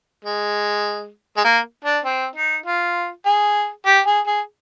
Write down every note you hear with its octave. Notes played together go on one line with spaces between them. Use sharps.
G#3
G#3
A#3
D4
C4
D#4
F4
G#4
G4
G#4
G#4